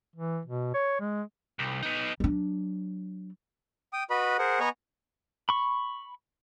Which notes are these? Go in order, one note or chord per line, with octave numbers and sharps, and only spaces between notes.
E3
B2
C#5
G#3
C2
B3 D#4
F#3 D4
G5 D#6
F#4 B4 D#5 B5
G#4 A#4 C5 F#5
B3 D#5 G#5 A#5 C#6
B5 C#6